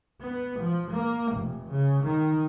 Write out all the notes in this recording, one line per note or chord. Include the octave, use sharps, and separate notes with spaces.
B3
F3
A#3
F1
C#3
D#3